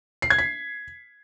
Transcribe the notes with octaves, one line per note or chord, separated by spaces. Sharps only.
C7
G#6
B6